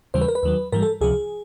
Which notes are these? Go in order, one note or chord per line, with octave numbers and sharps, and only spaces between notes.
D#2 C#3 E3 G3 C5
B4
A#4
B4
D#2 D#3 F#3
G#2 E3 G3 A#4
A4
C#2 C3 F3 G#4